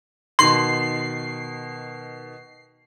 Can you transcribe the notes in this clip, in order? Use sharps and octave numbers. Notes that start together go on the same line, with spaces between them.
B2 D#3 C6 C7